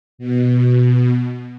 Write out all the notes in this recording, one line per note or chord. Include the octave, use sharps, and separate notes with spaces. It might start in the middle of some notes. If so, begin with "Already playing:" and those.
B2